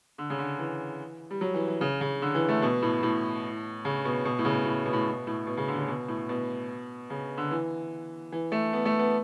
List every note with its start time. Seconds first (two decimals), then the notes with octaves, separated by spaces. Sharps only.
0.18 D3
0.30 C#3
0.39 D3
0.59 E3
1.31 G3
1.41 F#3
1.54 E3
1.68 E3
1.81 C#3
2.01 C#3
2.22 D3
2.35 E3
2.49 A3
2.62 B2
2.82 A2
3.03 A2
3.85 C#3
4.05 B2
4.25 B2
4.39 A2
4.45 C#3
4.52 B2
4.65 A2
4.85 B2
4.93 A2
5.07 B2
5.27 A2
5.47 B2
5.57 C#3
5.68 D3
5.78 C#3
5.88 B2
6.08 A2
6.29 B2
7.10 C#3
7.37 D3
7.51 E3
8.32 E3
8.52 A3
8.73 B3
8.86 A3
8.99 B3